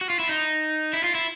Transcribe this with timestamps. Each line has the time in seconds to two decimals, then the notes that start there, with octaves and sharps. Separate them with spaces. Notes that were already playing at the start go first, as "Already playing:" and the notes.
0.01 F#4
0.10 F4
0.19 E4
0.29 D#4
0.93 E4
1.04 F4
1.15 E4